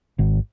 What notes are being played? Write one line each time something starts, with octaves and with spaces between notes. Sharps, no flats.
G#1